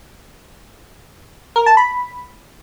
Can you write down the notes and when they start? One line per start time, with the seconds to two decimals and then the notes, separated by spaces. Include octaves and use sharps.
1.56 A#4
1.66 A5
1.77 B5